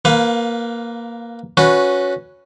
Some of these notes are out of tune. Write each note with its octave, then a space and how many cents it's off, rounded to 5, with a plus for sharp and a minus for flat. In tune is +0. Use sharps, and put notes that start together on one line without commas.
A#3 +0 B4 +10 F5 +30
C#4 +0 F#4 -15 B4 +0